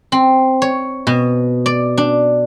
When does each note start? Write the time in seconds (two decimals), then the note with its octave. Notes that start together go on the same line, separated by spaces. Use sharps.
0.12 C4
0.62 C#5
1.07 B2
1.66 D5
1.98 D4